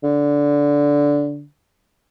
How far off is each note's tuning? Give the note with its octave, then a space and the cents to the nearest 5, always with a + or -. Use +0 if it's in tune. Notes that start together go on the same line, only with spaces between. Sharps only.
D3 -15